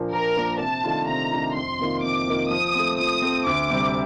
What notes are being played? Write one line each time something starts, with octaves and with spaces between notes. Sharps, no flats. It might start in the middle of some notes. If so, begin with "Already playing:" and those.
Already playing: A#2 F3 A#3 D4
A#2 A#4
F3 A#3 D4
C3 A5
D#3 A3 D4 F4
C3 A#5
D#3 A3 D4 F4
F2 C6
C3 D#3 A#3 F4
F2 D6
C3 D#3 A#3 F4
F3 D#6
A3 C4
F3 D#6
A3 C4
D2 D6
C3 G3